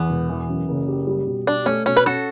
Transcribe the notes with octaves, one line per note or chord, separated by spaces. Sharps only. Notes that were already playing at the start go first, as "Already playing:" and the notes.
Already playing: E2 B3
E1
E3
F#2
F#1
G4
G3
B2
D4 G4
A3 C#4
B2 C#4
B4
C#4 F#4 A4